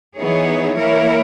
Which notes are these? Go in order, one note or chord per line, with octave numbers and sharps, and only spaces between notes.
E3 B3 D#4 G#4 C#5
E3 A#3 E4 A#4 C#5